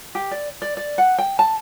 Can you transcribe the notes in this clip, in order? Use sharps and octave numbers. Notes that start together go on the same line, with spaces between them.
G4
D5
D5
D5
F#5
G5
A5